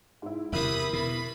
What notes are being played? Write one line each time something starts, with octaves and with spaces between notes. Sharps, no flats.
G#2 E4
E2 C3 E4 A#4 B5 D#6
B2 B5